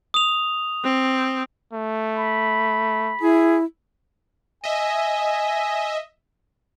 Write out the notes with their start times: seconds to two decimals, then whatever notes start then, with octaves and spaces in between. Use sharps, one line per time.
0.14 D#6 F7
0.84 C4
1.73 A3
2.15 B5
3.22 E4 G#4
4.64 D#5 E5 G#5